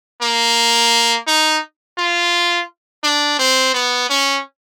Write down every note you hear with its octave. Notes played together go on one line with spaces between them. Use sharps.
A#3
D#4
F4
D4
C4
B3
C#4